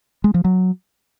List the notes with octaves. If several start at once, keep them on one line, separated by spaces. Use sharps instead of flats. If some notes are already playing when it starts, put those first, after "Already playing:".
G#3
F3
F#3